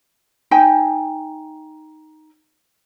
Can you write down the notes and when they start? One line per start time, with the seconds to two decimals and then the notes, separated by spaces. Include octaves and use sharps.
0.51 D#4 G5 G#5